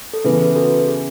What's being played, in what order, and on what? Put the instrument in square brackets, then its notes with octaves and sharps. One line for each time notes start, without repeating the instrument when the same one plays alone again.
[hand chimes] A4
[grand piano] C#3 E3 B3 [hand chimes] G#4 B4
[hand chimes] B4
F#4 A4
G#4